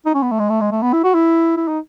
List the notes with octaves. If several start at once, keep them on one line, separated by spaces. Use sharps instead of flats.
D#4
C#4
B3
A3
G#3
A3
G#3
A3
B3
E4
F#4
E4
E4
D#4